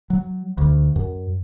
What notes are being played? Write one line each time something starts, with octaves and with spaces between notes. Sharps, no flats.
F#3
D2
F#2